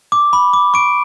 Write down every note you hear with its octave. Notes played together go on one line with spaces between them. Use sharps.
D6
B5
D6
C#6 D7